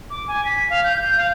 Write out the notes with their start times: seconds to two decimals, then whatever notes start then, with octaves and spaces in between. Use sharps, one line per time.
0.10 D6
0.28 G#5
0.45 B6
0.70 F5
0.84 G6
1.04 G6
1.17 F5